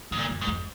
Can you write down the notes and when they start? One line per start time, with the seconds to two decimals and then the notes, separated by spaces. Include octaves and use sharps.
0.11 G#2 D3
0.18 A#2
0.29 F#2
0.41 G#2
0.47 F2